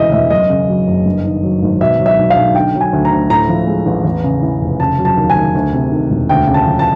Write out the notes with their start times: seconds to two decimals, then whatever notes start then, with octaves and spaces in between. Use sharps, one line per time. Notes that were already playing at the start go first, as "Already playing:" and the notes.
Already playing: E1 D2 C#3 E3 D#5 E5
0.12 E1 E5
0.30 F#2 D#5
0.50 C#3
0.68 F#3
0.88 F#1
1.06 G2
1.24 D#3
1.43 F#3
1.62 G#1
1.81 B2 E5
2.00 F#3
2.06 E5
2.18 B1
2.30 F5
2.37 B1
2.55 D3 G5
2.75 F#3
2.81 G#5
2.93 D2
3.05 A#5
3.11 D2
3.30 A2 A#5
3.49 F3
3.67 G#3
3.86 A1
4.04 E2
4.24 C#3
4.43 E3
4.61 F1
4.80 C#3 A5
4.98 F#3
5.05 A5
5.17 D#2
5.30 G#5
5.36 D#2
5.55 D2
5.73 C3
5.92 D#3
6.10 E1
6.29 D2 G5
6.47 C#3
6.54 A5
6.66 F3
6.79 A5